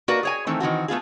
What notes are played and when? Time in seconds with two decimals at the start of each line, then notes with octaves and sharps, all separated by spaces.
0.08 A#3 F#4 A#4 B4 D5
0.23 G#4 C#5 G#5
0.47 D#3 E3 A3 C4
0.60 D#3 E3 C4 F#4
0.88 A3 B3 F4 G#4